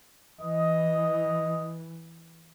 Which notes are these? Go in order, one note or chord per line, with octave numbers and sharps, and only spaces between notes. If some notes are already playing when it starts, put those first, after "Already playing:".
E3 D#5